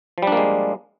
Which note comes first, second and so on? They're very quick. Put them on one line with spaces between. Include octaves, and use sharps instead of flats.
F3 G3 D4 A#3 G#3